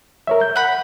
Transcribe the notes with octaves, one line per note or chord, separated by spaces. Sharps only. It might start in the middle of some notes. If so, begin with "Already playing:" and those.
A#4 C#5 E5
G6
F#5 B5